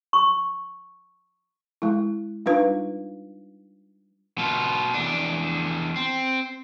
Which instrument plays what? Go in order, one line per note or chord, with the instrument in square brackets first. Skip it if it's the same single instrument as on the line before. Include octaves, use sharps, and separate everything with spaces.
[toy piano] C#6
[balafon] G#3 E4
G3 D4 D#4 F4 B4 F5
[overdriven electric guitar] B2 F4
E2 D4
C4